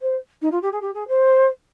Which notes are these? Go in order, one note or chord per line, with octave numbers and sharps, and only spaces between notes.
C5
D#4
F4
G4
G#4
G4
G#4
C5